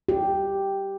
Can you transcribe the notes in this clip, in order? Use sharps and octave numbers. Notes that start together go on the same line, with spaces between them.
G4